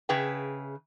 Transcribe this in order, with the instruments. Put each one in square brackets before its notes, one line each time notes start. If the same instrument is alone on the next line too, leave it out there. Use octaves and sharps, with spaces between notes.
[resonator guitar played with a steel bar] C#3 G#4 B4 E5 G5